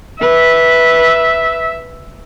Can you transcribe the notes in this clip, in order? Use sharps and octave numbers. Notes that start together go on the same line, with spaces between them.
B4 E5